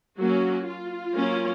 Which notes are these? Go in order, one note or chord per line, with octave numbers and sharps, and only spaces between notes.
F#3 A#3 C#4 F#4
F4
F#3 A#3 C#4